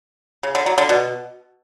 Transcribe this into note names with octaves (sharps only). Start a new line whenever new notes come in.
C#3
D3
F#3
D3
B2